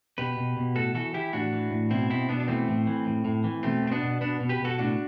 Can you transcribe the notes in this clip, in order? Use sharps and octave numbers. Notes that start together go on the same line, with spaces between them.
B2 G4 B4
B2
B2
A2 F#4 A4
E3 F#4 A4
E3 E4 G4
A2 D4 F#4
E3
A2
B2 C4 E4
B2 C4 E4
B2 B3 D4
D4
E3 A3 C4
A2
E3
A2
A2
E3
B2 A3 C4
B2
C4
B3 D4
B2
B2 B3 D4
B2
G4 B4
B2
F#4 A4
A2 D4 F#4